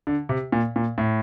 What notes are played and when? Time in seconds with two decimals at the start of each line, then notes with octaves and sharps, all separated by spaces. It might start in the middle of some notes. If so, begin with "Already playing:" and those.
0.07 D3
0.29 C3
0.52 A#2
0.76 A#2
0.98 A2